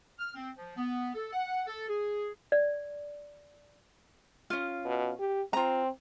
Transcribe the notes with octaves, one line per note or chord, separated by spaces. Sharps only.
F6
C4
F3
B3
A4
F#5
A4
G#4
D5
C#4 F4
B2
G4
C4 F4 A#5